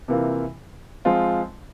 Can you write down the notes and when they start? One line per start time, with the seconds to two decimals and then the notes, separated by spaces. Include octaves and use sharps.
0.08 C3 E3 A#3 F4
1.05 F3 G#3 C4 F4